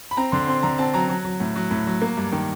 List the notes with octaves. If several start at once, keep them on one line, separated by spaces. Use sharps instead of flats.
B5
C4 A#5
D3 C6
C4 C6
D3 A#5
C4 A5
F#3 A#5
F#3
F#3
A2
F#3
A2
F#3
A#3
G2
D#3